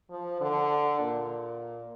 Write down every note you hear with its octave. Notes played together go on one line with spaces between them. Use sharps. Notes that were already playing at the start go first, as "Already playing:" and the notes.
F3
D3
A#2